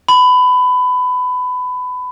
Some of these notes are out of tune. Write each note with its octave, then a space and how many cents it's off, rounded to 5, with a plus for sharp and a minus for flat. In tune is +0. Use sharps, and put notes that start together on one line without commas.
B5 +20